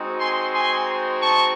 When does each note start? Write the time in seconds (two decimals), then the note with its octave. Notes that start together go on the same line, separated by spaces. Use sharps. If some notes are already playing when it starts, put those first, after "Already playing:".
Already playing: G#3 C4 D#4 F#4
0.19 G#5 C6
0.53 G#5 C6
1.21 A5 C#6